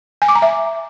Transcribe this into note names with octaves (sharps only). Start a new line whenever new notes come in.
G#5
D6
A#5
E5